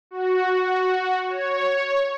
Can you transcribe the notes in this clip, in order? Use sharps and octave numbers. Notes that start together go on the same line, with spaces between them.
F#4
C#5